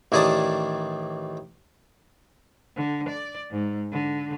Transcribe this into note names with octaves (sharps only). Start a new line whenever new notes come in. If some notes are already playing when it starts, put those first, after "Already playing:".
A1 D#3 G#4 D5 A5 D#6
D3
D5
G#2
D3